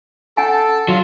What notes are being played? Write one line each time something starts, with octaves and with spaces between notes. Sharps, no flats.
C#4 A4 F#5 G#5 A5
F#3 F4